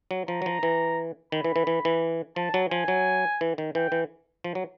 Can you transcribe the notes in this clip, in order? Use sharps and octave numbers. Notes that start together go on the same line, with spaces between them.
F#3
F3 A#5
F#3
F3
E3
D#3 B5
E3
E3
E3
E3
F3 A5
F#3
F3 G#5
F#3
E3
D#3
E3 G5
E3
F3
F#3